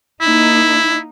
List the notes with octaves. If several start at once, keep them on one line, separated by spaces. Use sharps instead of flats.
A#3 D#4 E4